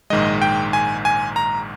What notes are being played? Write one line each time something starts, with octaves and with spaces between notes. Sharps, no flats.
A#1 G#2 D#3 G#3 D#5
G5
G#5
G#5
A#5